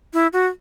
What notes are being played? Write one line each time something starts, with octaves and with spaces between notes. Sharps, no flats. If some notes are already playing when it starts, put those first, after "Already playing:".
E4
F#4